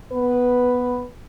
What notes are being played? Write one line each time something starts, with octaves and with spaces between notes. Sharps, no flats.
B3 B4